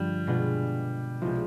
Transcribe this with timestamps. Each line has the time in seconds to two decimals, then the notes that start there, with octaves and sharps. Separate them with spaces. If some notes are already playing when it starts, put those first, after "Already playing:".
Already playing: G2 D3 F3 G3 G#3
0.27 B2 G#3 B3 D4 F4
1.22 C2 B2 F3 G#3